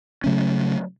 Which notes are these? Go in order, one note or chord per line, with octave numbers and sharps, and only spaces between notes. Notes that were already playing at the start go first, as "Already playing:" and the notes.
C#3 F#3 A3 C#4